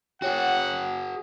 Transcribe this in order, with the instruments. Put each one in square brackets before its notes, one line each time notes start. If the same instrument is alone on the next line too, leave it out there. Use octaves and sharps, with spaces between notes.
[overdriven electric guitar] F#4 G#4 [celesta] C#5 G5 [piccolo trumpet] F#5